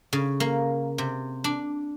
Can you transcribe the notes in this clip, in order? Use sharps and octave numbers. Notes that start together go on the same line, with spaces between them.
C#3
A#3
C3
D4